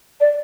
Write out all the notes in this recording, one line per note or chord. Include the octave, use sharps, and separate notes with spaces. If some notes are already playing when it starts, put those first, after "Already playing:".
D5